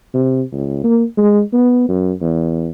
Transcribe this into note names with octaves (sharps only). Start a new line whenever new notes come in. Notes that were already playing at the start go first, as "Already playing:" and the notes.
C3
C#2
A#3
G#3
B3
F#2
E2